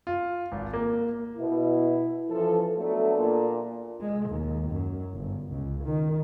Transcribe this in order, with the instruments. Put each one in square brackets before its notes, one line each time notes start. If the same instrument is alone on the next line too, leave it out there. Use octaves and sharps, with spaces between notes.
[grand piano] F4
G#1
A#3
[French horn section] B2 [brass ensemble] E4
[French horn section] F#2 E3 F3 [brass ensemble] A4
[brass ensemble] F#3 A3 [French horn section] B3 D4 A4
[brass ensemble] A#2
[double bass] G#3
D#2
F#2
G1
C#2
D#3